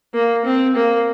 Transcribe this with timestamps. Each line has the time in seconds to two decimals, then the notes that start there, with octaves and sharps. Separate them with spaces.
0.14 A#3
0.45 C4
0.75 A#3